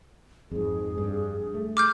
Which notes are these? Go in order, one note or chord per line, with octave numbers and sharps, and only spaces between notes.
F2 G#2 G#4
G2
A3
D6 F6 G6